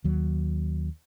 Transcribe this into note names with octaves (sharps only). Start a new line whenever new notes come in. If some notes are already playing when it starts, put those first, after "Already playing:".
D#2 F#3